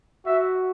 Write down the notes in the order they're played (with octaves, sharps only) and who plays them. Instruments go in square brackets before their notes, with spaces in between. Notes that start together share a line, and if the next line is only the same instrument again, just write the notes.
[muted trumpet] F#4 [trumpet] E5